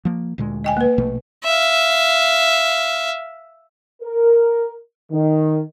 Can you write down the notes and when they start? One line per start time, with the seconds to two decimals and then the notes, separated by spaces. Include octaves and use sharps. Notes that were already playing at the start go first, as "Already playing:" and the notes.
0.05 F3 A#3
0.38 D2 A#2 G#3
0.64 D#5 G5 G#5
0.77 A#3 B4
0.98 A#1 B2 A3
1.44 E5 F5
4.02 A#4
5.11 D#3